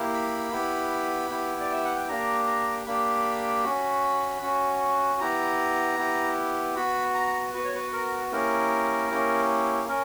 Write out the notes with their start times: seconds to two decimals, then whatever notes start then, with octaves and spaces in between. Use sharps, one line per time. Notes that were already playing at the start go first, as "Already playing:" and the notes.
Already playing: A#3 E4 G4
0.14 B5
0.52 B3 E4 G4
1.30 B3 E4 G4
1.61 D5
1.73 E5
1.85 F#5
1.96 G5
2.09 A#3 D4 G4 A#5
2.47 A#5
2.87 A#3 D4 G4 B5
3.64 C#4 F#4
4.42 C#4 F#4
5.20 B3 E4 G4 A#5
5.98 B3 E4 G4
6.76 B3 F#4 B5
7.15 A#5
7.54 B3 F#4 B4
7.65 C#5
7.75 B4
7.93 A#4
8.32 A#3 C#4 E4 G4 A#4
9.10 A#3 C#4 E4 G4
9.88 C#4 A#4